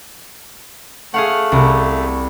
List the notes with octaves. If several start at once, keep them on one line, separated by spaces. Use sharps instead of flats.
A3 G#4 F5 F#5
C2